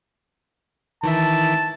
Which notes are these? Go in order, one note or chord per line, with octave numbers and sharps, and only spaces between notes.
D#3 E3 E5 A5